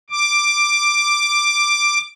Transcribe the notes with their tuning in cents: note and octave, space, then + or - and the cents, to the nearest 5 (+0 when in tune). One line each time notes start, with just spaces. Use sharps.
D6 +5